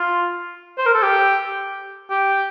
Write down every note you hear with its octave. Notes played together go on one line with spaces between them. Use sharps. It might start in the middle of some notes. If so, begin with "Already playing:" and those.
Already playing: F4
C5
A#4
A4
G4
G4